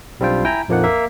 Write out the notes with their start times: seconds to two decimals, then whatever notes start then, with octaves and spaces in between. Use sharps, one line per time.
0.20 B1 G3 C4 D4 F4 G5
0.45 E4 G5 G#5 A#5
0.68 A#1 F2 F3 A#3 D#4 F#5
0.84 A#3 E5